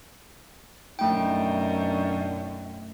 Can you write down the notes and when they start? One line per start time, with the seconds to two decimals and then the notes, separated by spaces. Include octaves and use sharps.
0.99 F#2 B2 A3 D4 D#4 G5